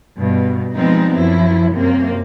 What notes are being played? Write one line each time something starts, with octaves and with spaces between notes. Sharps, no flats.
G2 B2
F3 G3 G#3 B3 C4 D#4
F#2 F3 F#3 E4
F#2 C3 A#3 C4